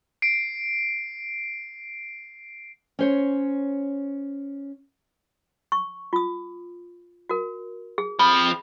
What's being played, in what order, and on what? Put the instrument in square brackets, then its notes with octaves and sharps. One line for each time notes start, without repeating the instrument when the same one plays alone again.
[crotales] C7 D7
[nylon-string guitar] C#4 C5 C#5
[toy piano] C#6
F4 D#6
F#4 A#4
G#4
[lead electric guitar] F3 C4 [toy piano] B5